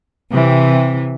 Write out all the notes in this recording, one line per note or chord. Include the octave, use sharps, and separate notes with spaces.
C3 E3